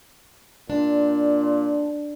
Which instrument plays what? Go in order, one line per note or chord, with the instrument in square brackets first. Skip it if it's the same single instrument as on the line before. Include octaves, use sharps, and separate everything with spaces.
[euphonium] A#2 [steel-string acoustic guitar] D4